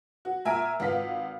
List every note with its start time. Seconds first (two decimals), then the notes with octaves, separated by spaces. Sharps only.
0.25 F#4
0.45 A#2 E5 G#5 A#5 F6 D7
0.80 G#1 F4 B4 F5 B6